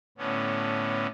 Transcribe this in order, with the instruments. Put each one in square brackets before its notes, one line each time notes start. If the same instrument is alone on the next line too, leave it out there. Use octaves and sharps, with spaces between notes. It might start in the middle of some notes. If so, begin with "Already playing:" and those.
[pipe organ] A2 D3 B3 C#4